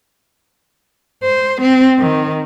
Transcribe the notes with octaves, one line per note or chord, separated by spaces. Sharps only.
C5
C4
D#3